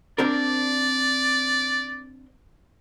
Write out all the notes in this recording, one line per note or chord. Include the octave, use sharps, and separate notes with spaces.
C4 D4 A#4 D5